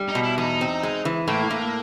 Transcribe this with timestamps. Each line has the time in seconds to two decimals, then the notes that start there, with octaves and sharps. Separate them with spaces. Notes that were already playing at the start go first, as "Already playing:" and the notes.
Already playing: G3
0.08 D#4
0.15 B2
0.24 E4
0.38 E2 D#4
0.61 C4
0.83 G#3
1.05 E3
1.28 A2 A#3
1.51 A2